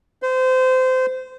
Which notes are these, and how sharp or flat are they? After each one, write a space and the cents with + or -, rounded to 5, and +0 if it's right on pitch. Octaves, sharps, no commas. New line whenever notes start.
C5 -25